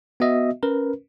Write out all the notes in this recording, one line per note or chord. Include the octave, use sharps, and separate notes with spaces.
B3 F#4 D#5 E5
C#4 A#4 B4